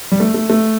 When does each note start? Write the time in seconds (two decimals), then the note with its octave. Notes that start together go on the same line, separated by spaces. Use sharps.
0.12 G3
0.20 A3
0.34 A3
0.50 A3